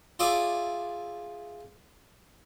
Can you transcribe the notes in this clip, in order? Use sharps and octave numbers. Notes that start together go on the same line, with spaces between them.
F4 G#4 D5 E5